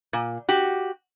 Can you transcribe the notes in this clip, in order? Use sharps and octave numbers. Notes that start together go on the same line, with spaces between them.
A#2
F#4 G4